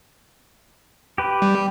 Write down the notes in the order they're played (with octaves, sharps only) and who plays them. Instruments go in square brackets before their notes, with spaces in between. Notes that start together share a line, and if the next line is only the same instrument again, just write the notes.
[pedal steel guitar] G4 B4
[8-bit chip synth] G3